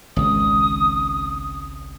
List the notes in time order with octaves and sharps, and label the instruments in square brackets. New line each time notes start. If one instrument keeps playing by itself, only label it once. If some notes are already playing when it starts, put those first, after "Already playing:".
[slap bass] G#1 C#2 [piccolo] D#6